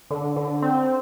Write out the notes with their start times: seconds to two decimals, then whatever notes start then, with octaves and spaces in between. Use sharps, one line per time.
0.11 D3
0.36 D3
0.62 C4